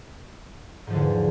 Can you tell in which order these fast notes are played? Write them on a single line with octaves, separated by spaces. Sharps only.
G#2 F3 D3 E2